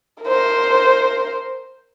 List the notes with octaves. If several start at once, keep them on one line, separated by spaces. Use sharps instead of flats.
A#4 C5